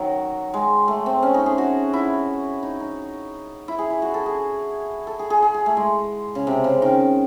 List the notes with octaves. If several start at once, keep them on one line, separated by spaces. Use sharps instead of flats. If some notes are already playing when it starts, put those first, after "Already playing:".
Already playing: D#3 F#3
G#3
A3
C4
C#4
D#4
G#4
F#4
E4
D#4
D#4
E4
G#4
E4
F#4
A4
G#4
A4
G#4
G#4
G#4
G#4
A3
G#3
C#3
C3
C#3
D#3